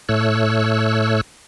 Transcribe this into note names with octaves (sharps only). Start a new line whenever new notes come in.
A2 A3 C#5 E6 F#6